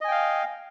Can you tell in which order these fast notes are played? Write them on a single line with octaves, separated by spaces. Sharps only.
D#5 G#5 G5 F5